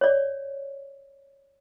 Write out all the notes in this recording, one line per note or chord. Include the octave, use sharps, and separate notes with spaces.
C#5 D5